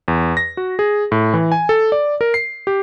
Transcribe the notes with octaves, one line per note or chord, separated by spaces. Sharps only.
E2
A#6
F#4
G#4
A2
E3
G#5
A4
D5
A#4
C7
G4